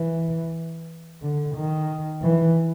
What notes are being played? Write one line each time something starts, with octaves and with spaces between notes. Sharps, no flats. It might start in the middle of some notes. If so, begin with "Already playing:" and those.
Already playing: E3
D3
D#3
E3